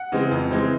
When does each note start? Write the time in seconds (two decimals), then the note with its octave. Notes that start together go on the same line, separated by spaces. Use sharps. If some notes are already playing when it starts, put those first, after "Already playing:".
Already playing: F#5
0.12 C#3 E3 G#3 C4
0.31 F2
0.51 C#3 E3 G#3 C4